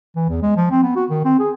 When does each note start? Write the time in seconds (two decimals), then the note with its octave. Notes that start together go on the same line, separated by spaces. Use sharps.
0.16 E3
0.29 E2
0.43 G#3
0.57 F3
0.71 C4
0.83 B3
0.96 F#4
1.10 D#3
1.25 C4
1.39 G#4